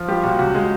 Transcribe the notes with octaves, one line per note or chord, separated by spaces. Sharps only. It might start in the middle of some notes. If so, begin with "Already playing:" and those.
Already playing: F3
G3 F4 G4
A#2 F#4
C#2 F#4
G#3